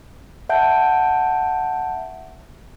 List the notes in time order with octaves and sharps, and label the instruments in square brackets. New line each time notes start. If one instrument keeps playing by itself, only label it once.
[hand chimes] E5 F#5 A5 G6 D7